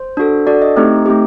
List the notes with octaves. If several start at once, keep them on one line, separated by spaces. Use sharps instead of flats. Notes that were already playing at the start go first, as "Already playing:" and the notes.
Already playing: C5
D4 F#4 A4
D4 F#4 A4 D5
D#5
A3 C4 D#4 G4
A3 C4 D#4 G4